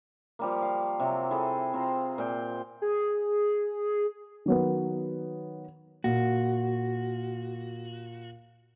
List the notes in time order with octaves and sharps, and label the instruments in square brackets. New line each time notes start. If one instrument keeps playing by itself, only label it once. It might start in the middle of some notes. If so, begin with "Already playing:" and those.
[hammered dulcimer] F3 G3 A#3
F5
C3 F#3 C4
E4 G#4 A4
C4 F4 C5 A#5
A#2 F5 G5
[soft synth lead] G#4
[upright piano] D#3 F#3 B3
[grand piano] A#2 [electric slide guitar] F#4